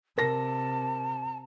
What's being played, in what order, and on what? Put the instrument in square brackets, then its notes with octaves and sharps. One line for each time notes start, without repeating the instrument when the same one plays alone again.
[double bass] C3 [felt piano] A#4 A#6 [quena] A5